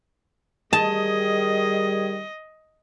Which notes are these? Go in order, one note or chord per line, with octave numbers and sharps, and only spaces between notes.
D#3 G3 G#4 D#5 A5